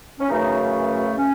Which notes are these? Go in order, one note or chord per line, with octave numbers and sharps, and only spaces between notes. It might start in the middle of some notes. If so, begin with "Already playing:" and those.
C#4
F#2 C#3 E3 A3 D#4
C#4